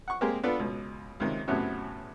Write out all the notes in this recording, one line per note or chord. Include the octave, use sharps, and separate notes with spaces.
F#5 C#6
G#3 A#3 C4 G4 G#4 A#4
B3 D4 F4 A4 B4
C#2 B2
C#2 C3 D#3
E2 A2 C3 F#3 B3 C#4